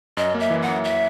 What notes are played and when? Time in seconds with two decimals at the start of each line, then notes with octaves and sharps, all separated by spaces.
0.17 F#2 D#5
0.34 A#3
0.40 E5
0.50 E3
0.62 F#5
0.68 F#2
0.84 E5